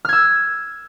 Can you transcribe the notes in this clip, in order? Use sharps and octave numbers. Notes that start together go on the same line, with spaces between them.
E6 F6 G#6